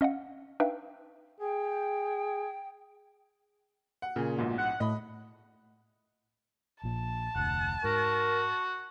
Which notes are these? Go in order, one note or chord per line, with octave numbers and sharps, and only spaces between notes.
C#4 D#5 F5 F#5
D4 D#4 B4 E5 F5 G5
G#4 G5
F#5
A#2 C#3 G#4
A#1 G#2 B2
F#5
A2 D#5 B5
A#1 A#2 A5
F1 D2 F#5
G#2 F#4 A#4